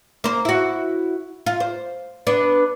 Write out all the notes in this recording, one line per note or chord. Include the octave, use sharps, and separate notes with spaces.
A#3 C5
E4 F#4
F4
C5
B3 D4